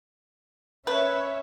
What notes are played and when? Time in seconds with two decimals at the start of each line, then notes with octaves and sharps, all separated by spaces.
0.87 C#4 B4 C#5 E5